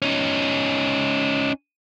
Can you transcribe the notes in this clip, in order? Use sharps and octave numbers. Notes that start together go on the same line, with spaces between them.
C#4 D#4